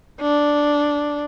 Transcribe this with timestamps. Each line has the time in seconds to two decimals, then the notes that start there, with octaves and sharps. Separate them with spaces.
0.21 D4